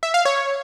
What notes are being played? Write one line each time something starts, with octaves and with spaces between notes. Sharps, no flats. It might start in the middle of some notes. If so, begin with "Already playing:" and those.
E5
F5
C#5